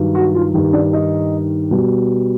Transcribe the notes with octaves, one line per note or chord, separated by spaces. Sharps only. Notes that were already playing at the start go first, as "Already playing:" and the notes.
Already playing: G2 D#3 F#3
F#4
F4
G2 D#3 G3
D4
D#4
B2 G3